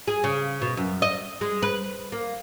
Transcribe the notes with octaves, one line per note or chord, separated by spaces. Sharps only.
G#4
C#3
B2
F#2
D#5
G#3
B4
A#3